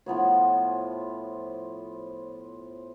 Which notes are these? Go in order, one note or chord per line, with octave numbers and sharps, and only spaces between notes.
A2 F3 B3 C#5